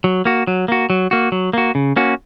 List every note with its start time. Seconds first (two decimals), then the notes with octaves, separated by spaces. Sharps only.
0.04 F#3
0.25 A#3 F#4
0.47 F#3
0.68 A#3 F#4
0.90 F#3
1.11 A#3 F#4
1.32 F#3
1.53 A#3 F#4
1.75 C#3
1.96 A#3 C#4 F#4